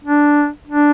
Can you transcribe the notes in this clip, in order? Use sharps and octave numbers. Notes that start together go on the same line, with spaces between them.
D4
D4